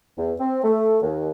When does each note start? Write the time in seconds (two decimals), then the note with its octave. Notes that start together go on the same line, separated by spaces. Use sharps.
0.18 E2
0.40 C4
0.64 A3
1.02 D#2